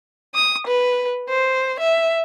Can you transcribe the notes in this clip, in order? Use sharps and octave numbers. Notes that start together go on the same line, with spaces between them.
D#6
B4
C5
E5